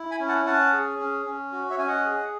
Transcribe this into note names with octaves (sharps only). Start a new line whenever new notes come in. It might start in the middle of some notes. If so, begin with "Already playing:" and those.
Already playing: E4
G#5 B5
C#4
F#5 A5
C#4 F#5 A5
G#4
C#4
C#4
F#4
C#5 E5
C#4 G#5
D#5 F#5
G#4